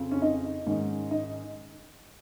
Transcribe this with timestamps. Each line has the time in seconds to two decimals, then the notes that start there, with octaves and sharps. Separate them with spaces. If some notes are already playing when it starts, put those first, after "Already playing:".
Already playing: F2 C#3 F3 C4
0.11 C#4
0.22 D#4
0.66 G#2 D#3 G#3 C#4
1.11 D#4